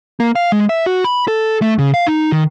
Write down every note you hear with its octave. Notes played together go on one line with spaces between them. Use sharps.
A#3
F5
G#3
E5
F#4
B5
A4
A3
C#3
F5
D#4
D#3